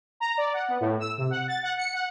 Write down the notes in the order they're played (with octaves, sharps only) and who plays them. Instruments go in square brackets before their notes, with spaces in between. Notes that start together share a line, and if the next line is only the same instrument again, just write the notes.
[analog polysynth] A#5
D5
F#5
B3
A2
E6
C3
F#5
A6
F#5
C#7
F#5